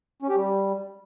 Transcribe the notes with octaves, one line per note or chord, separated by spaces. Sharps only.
C#4
G4
G3